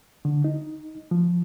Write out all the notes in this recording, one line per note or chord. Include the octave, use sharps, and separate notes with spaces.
D3
D#4
F3